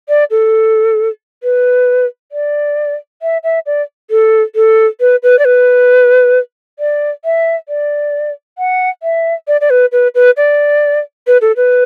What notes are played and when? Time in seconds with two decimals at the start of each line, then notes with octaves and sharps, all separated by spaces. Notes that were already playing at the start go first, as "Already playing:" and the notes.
0.09 D5
0.31 A4
1.43 B4
2.32 D5
3.22 E5
3.44 E5
3.66 D5
4.11 A4
4.55 A4
5.00 B4
5.23 B4
5.39 D5
5.45 B4
6.79 D5
7.25 E5
7.69 D5
8.58 F#5
9.03 E5
9.48 D5
9.61 D5
9.70 B4
9.92 B4
10.15 B4
10.37 D5
11.27 B4
11.42 A4
11.57 B4